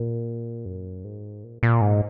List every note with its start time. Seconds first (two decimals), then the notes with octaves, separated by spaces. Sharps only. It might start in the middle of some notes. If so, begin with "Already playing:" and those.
Already playing: A#2
0.65 F#2
1.04 G#2
1.44 A#2
1.63 A#2
1.81 G#2